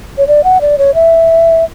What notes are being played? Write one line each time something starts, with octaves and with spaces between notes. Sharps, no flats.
C#5
D5
F#5
D5
C#5
E5